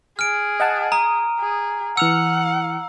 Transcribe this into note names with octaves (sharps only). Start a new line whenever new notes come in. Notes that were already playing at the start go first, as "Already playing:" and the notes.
G#4 F6 D7
D#5 F#5 A5
A#5 D#6
G#4
E3 F#5 E6 F6 C#7